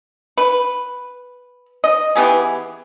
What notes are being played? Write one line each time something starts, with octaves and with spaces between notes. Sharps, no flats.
B4
D#5
E3 B3 G4 G#4